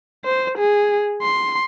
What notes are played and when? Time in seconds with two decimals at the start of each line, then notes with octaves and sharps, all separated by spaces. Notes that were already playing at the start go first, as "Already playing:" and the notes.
0.25 C5
0.58 G#4
1.22 C6